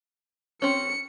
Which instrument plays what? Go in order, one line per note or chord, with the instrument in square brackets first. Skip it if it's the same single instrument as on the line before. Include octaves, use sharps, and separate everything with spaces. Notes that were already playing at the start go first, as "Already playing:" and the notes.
[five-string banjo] C4 C#4 [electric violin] C#7